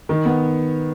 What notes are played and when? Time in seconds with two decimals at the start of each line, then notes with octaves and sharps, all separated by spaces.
0.09 D#3
0.25 B3